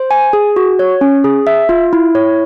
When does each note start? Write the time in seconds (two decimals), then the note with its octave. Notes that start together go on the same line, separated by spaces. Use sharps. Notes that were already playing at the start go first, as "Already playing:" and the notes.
Already playing: C5
0.11 G#5
0.33 G#4
0.56 F#4
0.79 C#5
1.01 C#4
1.24 G#4
1.47 E5
1.69 F4
1.93 E4
2.15 C#5